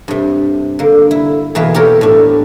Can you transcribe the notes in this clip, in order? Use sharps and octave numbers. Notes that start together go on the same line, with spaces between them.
G2 C3
D3 A#3
E4
E2 B2 E3 A#3 G#4 B4
G4 A4 A#4 C#5
A2 D4